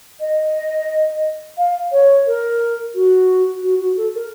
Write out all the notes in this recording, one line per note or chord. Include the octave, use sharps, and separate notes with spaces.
D#5
F5
C#5
A#4
F#4
F#4
F#4
A4
A#4